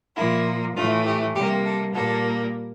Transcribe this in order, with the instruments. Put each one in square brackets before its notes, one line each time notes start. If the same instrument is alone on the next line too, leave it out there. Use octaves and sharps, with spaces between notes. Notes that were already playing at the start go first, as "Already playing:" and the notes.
[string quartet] A#2 F3 A#3 E4
A2 E3 A3 F4
G4
C3 G3 A#3 G4
A4
A#2 G3 A#3 A4